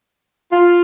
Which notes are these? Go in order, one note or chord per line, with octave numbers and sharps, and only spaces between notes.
F4